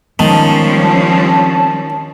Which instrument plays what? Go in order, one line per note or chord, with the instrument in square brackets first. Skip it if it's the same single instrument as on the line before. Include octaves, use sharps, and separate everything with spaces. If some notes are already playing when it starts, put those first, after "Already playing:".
[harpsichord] D#3 [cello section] F3 G3 C#4 [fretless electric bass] G#3 B3 [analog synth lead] A5